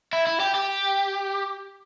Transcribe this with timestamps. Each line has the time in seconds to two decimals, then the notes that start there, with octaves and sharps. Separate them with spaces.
0.13 E4
0.27 E4
0.40 G4
0.55 G4